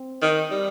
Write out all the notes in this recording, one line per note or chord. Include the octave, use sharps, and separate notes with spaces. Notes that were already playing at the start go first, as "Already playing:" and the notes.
Already playing: C4
D#3
G3